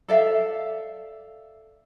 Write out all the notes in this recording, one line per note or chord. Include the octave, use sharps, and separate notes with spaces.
A4 D5 E5 F5